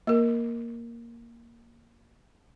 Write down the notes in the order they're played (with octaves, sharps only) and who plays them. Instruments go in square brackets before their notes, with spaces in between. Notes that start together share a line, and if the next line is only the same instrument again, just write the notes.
[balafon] A#3 A#4